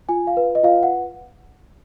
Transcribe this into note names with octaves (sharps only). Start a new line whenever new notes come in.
F4 G#5
F5
B4
D#5
F4 F5
F#5